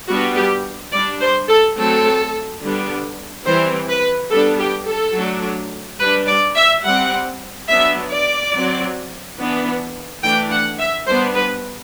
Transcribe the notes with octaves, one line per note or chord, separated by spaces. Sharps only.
G3 B3 D4 F#4
G4
G3 D4 D5
C5
A4
F#3 A3 C4 A4
D3 G3 B3 D4
E3 G3 C4 C5
B4
G3 B3 D4 A4
G4
A4
F#3 A3 D4
G3 D4 B4
D5
E5
G3 C4 F#5
F#3 B3 D4 E5
D5
F#3 C4
E3 B3 D4
E3 A3 D4 G5
F#5
E5
G3 B3 D4 C5
B4